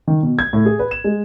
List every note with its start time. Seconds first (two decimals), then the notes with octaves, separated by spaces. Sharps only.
0.07 D#3
0.23 B2
0.39 G#6
0.53 A2
0.66 G#4
0.79 B4
0.91 E7
1.04 G#3